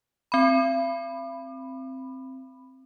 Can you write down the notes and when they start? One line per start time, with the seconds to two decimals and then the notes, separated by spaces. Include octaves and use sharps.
0.32 C4 B5